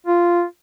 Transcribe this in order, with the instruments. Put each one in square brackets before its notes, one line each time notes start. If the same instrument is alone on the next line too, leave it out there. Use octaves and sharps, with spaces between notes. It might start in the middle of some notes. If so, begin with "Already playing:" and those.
[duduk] F4